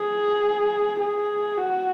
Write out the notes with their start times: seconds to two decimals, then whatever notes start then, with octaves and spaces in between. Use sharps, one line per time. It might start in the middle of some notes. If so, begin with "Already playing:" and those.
Already playing: G#4
1.00 G#4
1.57 F#4